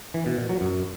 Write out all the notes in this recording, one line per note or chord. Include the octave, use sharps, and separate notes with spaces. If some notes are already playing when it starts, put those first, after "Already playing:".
E3
B2
A#2
F#3
F#2